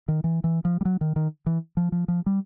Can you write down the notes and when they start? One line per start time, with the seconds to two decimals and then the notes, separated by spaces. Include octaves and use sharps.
0.08 D#3
0.24 E3
0.44 E3
0.65 F3
0.81 G3
0.85 F#3
1.01 D#3
1.16 D#3
1.46 E3
1.77 F3
1.92 F3
2.08 F3
2.26 G3